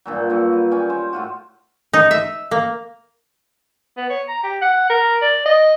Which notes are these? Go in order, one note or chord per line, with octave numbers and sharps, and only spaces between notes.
G2 A#2 F#3
G2 F#3
B4
C#4 D5 G5 G#5
C5 C#5
A2 F4 F#4
D#4
E5
A#3
B3
C#5
A#5
G4
F#5
A#4
D5
D#5